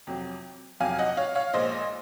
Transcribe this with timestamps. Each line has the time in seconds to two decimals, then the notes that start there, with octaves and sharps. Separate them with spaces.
0.07 F2 C3 F#3
0.80 F2 C3 F#3 F5 G#5
0.99 D#5 F#5
1.17 C#5 F5
1.35 C#5 F5
1.54 A#1 A#2 G#3 C5 D#5